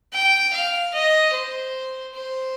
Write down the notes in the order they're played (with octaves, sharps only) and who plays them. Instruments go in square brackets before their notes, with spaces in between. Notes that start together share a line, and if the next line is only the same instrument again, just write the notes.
[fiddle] G5
F5
D#5
C5
C5